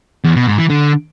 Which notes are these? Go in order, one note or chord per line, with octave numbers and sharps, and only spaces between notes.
E2
B2
G#2
E3
D3